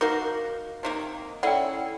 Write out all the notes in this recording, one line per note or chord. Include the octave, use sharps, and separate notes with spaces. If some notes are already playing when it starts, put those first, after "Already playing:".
D#4 F#4 A#4 F5 D6 A#6
C3 D#3 A#3
C#4 E4 A4 D5 F#5 G5